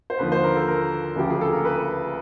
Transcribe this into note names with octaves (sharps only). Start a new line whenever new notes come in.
C5
D#2 D3 F3 B4
C5
A#4
A4
A#4
D2 C#3 F3 G4
G#4
A4
A#4
B4